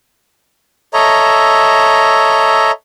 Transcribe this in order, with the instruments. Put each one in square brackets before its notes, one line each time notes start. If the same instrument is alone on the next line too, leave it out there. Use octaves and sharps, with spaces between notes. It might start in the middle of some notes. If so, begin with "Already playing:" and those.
[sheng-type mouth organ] A4 C#5 D#5 E5 A#5